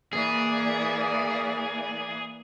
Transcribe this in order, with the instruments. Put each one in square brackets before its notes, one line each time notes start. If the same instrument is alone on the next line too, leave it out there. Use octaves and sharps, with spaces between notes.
[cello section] E3 A#3 D5 [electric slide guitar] G#4